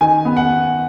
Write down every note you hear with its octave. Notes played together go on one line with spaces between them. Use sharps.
D#3 G#5
B3
F#5